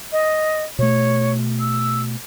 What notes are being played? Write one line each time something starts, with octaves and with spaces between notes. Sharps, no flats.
D#5
B2 A3 C#5
E6